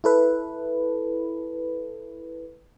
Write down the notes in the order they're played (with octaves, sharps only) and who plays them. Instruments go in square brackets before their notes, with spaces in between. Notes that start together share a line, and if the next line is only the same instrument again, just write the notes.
[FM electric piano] E4 A4 B4